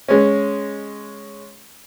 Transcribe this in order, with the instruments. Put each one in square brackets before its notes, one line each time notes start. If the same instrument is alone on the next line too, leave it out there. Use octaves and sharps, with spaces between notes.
[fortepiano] G#3 C#4